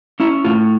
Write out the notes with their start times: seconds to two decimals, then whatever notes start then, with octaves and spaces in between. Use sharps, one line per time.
0.20 C#4 E4
0.45 A2 F4